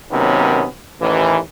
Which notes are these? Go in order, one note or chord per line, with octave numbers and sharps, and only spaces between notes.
C3 D#3 F#3 A#3 B3 C#4
A1 D#2 E3